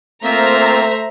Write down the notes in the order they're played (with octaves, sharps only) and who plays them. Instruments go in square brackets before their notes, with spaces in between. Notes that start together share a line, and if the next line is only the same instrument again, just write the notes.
[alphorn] A3 [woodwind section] A#3 C4 F4 [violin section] C5 A#5 [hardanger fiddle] E5